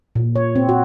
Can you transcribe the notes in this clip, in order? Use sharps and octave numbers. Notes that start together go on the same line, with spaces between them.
A#2
C#5
C4
F#4